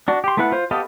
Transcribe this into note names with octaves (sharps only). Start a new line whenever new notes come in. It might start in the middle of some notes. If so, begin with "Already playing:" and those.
D4 F#4
G4 C6
A3 B3 E4 B4 F#5
F4 C5
B3 G4 A4 D#5 F5